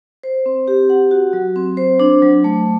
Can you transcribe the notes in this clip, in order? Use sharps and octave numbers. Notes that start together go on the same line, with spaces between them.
C5
C4
G4
F#5
F#4
F#3
C4
C5
D4
F#3
A3